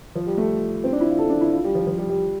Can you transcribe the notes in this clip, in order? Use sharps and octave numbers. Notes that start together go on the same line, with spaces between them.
F3
G3
A3
C4
D4
E4
F4
A4
D4
E4
F4
G3
F3
F3
G3
G3